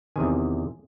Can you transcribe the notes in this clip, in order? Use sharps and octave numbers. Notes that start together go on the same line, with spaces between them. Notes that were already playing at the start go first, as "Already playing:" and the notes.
E2 C3 D#3 G#5